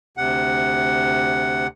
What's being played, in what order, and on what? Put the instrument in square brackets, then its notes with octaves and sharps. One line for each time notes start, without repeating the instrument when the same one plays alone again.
[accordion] D2 C3 F#5